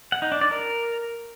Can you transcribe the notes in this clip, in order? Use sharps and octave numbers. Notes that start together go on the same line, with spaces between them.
F#5
D#4
D4
D5
A#4